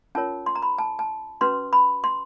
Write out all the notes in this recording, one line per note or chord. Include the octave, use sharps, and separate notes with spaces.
C#4 F4 A#4 C#5 A5
C6
A#5
B5
A5
A5
C#4 F#4 B4 C6
B5
C6